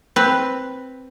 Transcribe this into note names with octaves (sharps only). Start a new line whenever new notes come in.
C4 B4